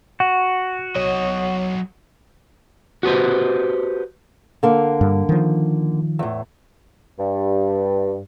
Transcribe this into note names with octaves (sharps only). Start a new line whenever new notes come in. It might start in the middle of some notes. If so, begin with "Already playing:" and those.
F#4 F#5
C2 F#3 C#5 D#5
F#4 G4 B4 C5
D3 A#3
G2
D#3 F3
E2 A2
G2